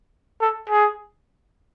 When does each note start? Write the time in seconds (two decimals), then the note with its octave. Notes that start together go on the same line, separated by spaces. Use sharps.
0.41 A4
0.70 G#4